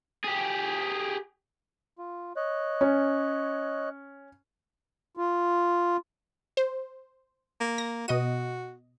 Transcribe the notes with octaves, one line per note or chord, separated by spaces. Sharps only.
G4 G#4
F4
C#5 D#5 F#6
C#4
F4
C5
A#3
A#6
B2 F#4 D#5 D#7